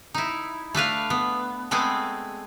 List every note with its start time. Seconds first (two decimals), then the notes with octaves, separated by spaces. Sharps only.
0.14 D#4 E4
0.75 A3 D4 B4 F5
1.10 B3
1.71 G#3 A3 B3 C4 G#4